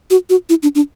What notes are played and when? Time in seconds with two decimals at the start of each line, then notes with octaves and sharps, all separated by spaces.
0.10 F#4
0.30 F#4
0.49 E4
0.63 D4
0.75 D4